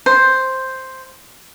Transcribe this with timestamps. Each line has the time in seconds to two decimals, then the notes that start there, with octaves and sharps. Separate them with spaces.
0.06 C5